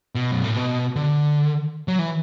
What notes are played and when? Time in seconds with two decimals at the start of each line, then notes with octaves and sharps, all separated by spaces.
0.15 B2
0.32 F#2
0.44 A2
0.56 B2
0.96 D3
1.88 F#3
1.99 E3